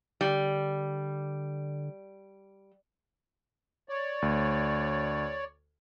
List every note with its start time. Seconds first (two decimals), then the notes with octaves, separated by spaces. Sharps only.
0.21 D3 G3
3.89 C#5 D5
4.22 D2